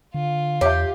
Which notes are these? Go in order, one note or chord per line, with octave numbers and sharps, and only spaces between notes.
D3 F4
E2 G4 C#5 E5